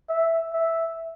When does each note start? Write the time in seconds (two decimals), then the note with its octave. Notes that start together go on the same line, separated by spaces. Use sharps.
0.09 E5
0.53 E5